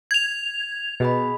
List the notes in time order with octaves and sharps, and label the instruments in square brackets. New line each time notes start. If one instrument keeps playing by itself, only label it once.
[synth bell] G#6 F7
[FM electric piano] B2 [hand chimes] G#4 D#5 B5